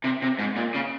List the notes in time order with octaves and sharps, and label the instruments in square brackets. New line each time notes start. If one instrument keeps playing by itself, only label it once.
[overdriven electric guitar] C3
C3
G#2
A#2
C#3